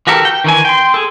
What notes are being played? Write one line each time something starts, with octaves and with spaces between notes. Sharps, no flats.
E3 F#4 G4 A4 A#4
G5
D#3 E3 G#5
G5 C6
G#4 A4